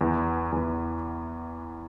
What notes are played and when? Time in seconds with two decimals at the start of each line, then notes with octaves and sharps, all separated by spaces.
0.01 E2 E3
0.52 E2 E3